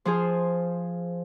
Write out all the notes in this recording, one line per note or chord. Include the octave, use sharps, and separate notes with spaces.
F3 F4 G#4 C5